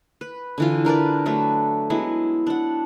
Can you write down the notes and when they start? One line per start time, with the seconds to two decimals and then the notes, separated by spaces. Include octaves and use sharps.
0.21 B4
0.58 D3 E3 F4
0.85 D4 A#4 B4 D5
1.26 F#3 A3 B4
1.90 F#3 G#3 B3 E4
2.47 D4 F#5